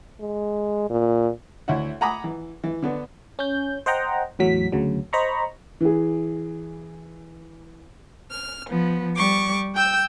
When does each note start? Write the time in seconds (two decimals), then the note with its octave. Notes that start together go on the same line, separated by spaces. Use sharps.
0.20 G#3
0.90 A#2
1.68 D2 E4 C#5 E5 F#5
2.01 F#5 G#5 A#5 B5 D6 D#6
2.24 E3
2.64 E3
2.82 D3 B3 D4
3.39 C#4 G6
3.86 C5 D#5 F#5 G5 A#5
4.39 E2 A2 F#3 B6
4.72 D2 C#3 F#3
5.13 C5 D#5 A#5 B5 C#6
5.81 E3 G#4
8.31 F6
8.68 F3 B3
9.16 G3 C#6 D6
9.75 G5 E6 G6